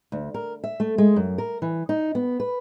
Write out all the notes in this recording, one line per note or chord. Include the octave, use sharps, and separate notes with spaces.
D2
A#4
E5
A3
G#3
F#2
A#4
E3
D#4
B3
B4